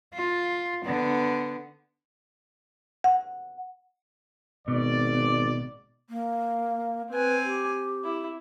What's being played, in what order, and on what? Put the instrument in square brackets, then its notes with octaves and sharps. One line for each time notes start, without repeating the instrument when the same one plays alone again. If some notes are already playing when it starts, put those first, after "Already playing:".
[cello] F4
D3 B3
[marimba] F#5
[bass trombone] G#1 [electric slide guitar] B2 [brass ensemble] D5
[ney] A#3
[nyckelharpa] C4 G#5 [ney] B4
[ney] G4
[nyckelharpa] E4